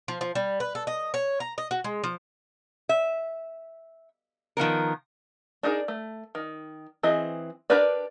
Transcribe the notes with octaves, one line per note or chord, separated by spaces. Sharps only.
F3
F3
G3
B4
A4
D#5
C#5
A#5
D#5
F#4
G#3
F3
E5
D#3 F3 B3 A#4
D4 D#4 G#4 A#4
A3
D#3
E3 C4 G#4 D#5
D4 G4 A#4 B4 D5